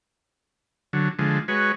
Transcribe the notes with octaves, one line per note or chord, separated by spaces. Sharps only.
D3 F#3
D3 F3 G#3
G#3 F#4 B4 C#5